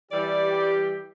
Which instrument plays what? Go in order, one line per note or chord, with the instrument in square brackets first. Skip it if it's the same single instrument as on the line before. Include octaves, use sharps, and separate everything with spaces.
[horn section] E3 G3 [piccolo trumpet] G4 [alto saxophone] D5
[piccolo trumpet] G4